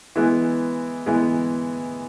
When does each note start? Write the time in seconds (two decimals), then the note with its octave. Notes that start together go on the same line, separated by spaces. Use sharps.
0.16 E3 G#3 B3
1.06 E3 G#3 B3